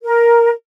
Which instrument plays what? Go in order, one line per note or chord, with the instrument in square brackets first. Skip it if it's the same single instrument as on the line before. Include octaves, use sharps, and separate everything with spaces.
[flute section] A#4